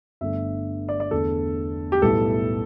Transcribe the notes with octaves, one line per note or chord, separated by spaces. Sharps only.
G1 G2 D3 A3 E5
D5
D5
E2 D3 A3 D4 A4
G4
B1 A2 G3 B3 E4 A4